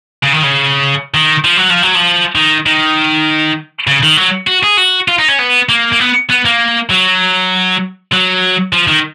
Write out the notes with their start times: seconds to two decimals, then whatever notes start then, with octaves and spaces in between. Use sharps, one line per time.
0.23 C#3
0.33 D#3
0.43 C#3
1.14 D#3
1.45 F3
1.57 F#3
1.70 F3
1.83 F#3
1.95 F3
2.35 D#3
2.66 D#3
3.87 C#3
4.03 D#3
4.17 F#3
4.47 F#4
4.64 G#4
4.78 F#4
5.08 F4
5.19 D#4
5.28 C#4
5.39 B3
5.69 A#3
5.92 A#3
6.00 B3
6.30 B3
6.45 A#3
6.91 F#3
8.12 F#3
8.73 F3
8.87 D#3